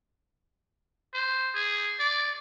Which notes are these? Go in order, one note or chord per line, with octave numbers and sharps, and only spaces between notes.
C5
G#4
D5